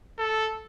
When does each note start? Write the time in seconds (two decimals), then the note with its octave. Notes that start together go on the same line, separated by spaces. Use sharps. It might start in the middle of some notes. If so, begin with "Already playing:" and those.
0.18 A4